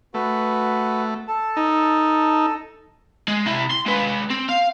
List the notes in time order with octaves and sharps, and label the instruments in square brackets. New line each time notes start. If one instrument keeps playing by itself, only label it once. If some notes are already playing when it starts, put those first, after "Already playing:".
[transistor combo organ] A3 [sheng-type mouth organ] F#4 B4
[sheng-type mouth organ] A4 A5
[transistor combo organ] D#4
[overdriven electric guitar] G#3
C3 E4
C6
G#3 B4
C4
F5